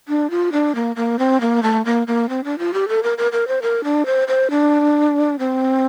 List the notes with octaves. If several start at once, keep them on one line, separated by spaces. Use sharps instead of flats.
D4
F4
D4
A#3
A#3
C4
A#3
A3
A#3
A#3
C4
D4
F4
G4
A4
A#4
A#4
A#4
C5
A#4
D4
C5
C5
D4
C4